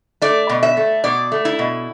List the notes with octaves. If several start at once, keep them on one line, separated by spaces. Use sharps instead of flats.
A3 D5
B2
E5
A3
B2 D5
A3
E4
B2